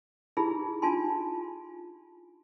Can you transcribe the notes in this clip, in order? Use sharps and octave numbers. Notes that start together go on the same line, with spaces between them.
D#4 E4 G4 G#4 B5
D4 D#4 F4 G#5 A5 C6